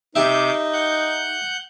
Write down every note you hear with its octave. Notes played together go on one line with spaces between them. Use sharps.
C3 D#4 G4 E5 D6 G6
F#5 G6